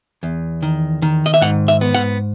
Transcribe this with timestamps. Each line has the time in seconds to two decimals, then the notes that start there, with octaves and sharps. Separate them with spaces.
0.23 E2
0.62 D#3
1.02 D#3
1.26 D#5
1.34 E5
1.41 G#2 F#5
1.68 E5
1.81 B3
1.94 F#5